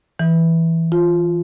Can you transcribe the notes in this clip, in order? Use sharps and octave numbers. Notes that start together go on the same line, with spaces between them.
E3
F4